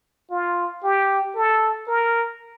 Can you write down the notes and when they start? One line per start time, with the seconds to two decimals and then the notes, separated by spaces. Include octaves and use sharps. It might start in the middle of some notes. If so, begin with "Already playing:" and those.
0.31 F4
0.83 G4
1.35 A4
1.88 A#4